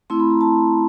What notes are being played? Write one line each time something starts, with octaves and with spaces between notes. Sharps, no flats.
A3 C4 E4 C6
B5
A#5
A5